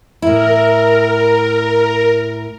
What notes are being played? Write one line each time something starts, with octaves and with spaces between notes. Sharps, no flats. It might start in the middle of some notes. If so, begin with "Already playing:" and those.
A2 E4 A#4